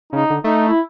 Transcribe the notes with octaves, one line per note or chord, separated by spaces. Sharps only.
C#3 D#4
D3
A3 D#4
E4